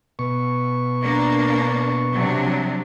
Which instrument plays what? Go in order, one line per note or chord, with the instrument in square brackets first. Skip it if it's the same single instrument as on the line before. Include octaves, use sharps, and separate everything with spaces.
[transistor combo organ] B2 C#6
[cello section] A#3 D4
C3 F#3 D4